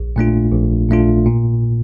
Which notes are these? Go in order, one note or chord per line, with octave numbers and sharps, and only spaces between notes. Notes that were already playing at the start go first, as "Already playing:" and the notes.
Already playing: A#1
A#2 A3 D4 F4
A#1
A#2 A3 D4 F4
A#2